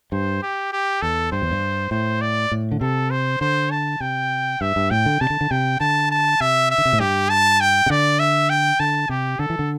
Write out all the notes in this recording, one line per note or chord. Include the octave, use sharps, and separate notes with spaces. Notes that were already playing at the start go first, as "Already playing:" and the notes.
G2 C5
G4
G4
E2 A4
G2 C5
E2
G2
A2 C5
D5
A2
D3
C3 A4
C5
D3 C5
A5
C3 G5
G2 E5
G2
A2 G5
D3
C3 A5
D3
D3
C3 G5
D3 A5
A5
C3 E5
E5
D3
C3
A2
G2 G4
A5
G5
C3
D3 D5
E5
G5
D3 A5
C3 G4
D3 A4
E3
D3